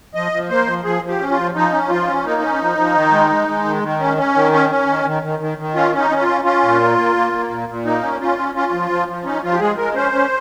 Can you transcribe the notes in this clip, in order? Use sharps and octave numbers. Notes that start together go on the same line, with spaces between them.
F3 D#5
F3
A#3 C5
F3
F3 G#4
F3
G4
C#4
F4
F3
F3 D#4
C#4
F3 F4
C#4
A#3 D#4
C#4
F3
F3
D#3
G#3
G#3
G#3
D#3
D#3
C#4
C#4
D#3
C#4
C#4
D#3
D#3
D#3
D#3
D#3
C#4 F4
C#4
D#4
C#4
F4
C#4
C#4 F4
A#2
A#3
A#3
A#3
A#3
A#2
A#2
A#3 D#4
C#4
C#4 F4
C#4
C#4 F4
F3
F3
F3
C#4 D#4
F3 F4
G4
G#3 G#4
G#3 A#4
C#4 C5
C#4